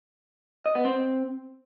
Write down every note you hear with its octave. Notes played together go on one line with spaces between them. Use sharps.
D#5
B3
C4